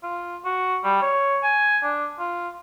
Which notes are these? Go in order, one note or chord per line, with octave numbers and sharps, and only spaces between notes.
F4
F#4
G3
C#5
G#5
D4
F4